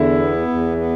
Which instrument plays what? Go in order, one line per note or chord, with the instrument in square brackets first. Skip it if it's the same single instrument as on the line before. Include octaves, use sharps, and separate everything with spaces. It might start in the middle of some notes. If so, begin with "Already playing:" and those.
Already playing: [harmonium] E2 D3 [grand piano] E4
[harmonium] B3
E2
B3